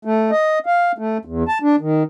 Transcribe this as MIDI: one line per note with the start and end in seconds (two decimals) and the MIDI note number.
0.05 0.31 57
0.31 0.59 75
0.66 0.92 77
0.98 1.18 57
1.25 1.44 40
1.48 1.58 81
1.62 1.76 62
1.80 2.03 51